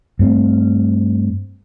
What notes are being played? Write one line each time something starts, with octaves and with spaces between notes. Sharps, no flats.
G2 A3 C4